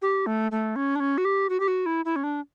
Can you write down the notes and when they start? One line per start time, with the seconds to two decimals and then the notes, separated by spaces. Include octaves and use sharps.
0.02 G4
0.27 A3
0.52 A3
0.76 C#4
0.96 D4
1.00 C#4
1.18 F#4
1.25 G4
1.50 F#4
1.60 G4
1.68 F#4
1.86 E4
2.05 E4
2.16 C#4
2.24 D4